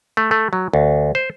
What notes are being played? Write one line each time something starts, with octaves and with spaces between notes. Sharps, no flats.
A3
A3
F#3
D2
C5